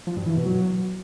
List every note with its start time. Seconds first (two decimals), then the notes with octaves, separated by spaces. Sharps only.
0.07 F3
0.17 G2
0.26 E3
0.36 B2
0.46 F#3